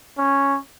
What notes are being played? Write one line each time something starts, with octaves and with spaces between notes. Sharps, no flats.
C#4